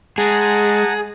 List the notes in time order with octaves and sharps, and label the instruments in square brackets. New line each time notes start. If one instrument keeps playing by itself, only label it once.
[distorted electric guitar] G#3 [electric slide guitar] G#4 [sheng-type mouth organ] F#5 A5 A#5